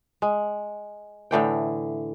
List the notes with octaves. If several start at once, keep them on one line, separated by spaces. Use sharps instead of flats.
G#3
A2 D3 E3 G5